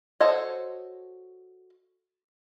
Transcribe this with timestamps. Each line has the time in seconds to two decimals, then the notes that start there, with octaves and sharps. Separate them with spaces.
0.20 F#4 A4 C5 C#5 D#5